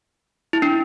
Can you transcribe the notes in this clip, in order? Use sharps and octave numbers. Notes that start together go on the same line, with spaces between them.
E4
D4